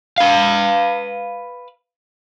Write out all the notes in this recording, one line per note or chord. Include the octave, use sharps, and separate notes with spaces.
B4 F5